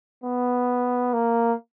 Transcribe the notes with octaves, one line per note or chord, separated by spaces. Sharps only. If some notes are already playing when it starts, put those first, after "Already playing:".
B3
A#3